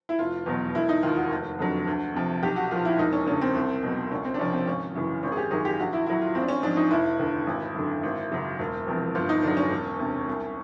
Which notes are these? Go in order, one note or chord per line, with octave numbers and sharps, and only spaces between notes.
E4
F1 F4
E2 B2 F#3
E1 E4
D#4
D#2 D#3 F4
F#4
F1
F2 D3 F#3
D2
C3 F3
B1 G4
F#4
A#2 F3 F4
E4
E1 D#4
C#4
D2 C#3 C#4
C4
C2
B2 F#3
C#2 C#4
C4
D4
C3 F3 C#4
C4
G#1 C#4
F#2 C#3 E3
G#1 C#4
G#4
G4
F#2 D#3 F#3 G#4
G4
A#1 F#4
E4
A2 F#3 E4
F4
A1 C4
D4
C#4
G#2 F3 D4
D#4
F1 E4
D#2 D3
G#1
F#2 D3
G#1
F#2 C#3 F#3
E1
E2 C3 F3
G1 F4
D#4
G2 D3 F#3 D4
C#4
E1
D2 C3
C2